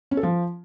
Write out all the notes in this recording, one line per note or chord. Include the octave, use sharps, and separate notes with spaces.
C#4
A4
F3